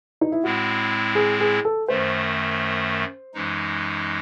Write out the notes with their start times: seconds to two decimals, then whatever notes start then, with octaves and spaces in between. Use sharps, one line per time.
0.21 D#4
0.32 E4
0.43 A2 G#3 C4 E4 F#4
1.15 G#4
1.40 G#4
1.65 A4
1.88 F#2 D#3 A3 C5
3.34 F#2 E3 G#3 D#4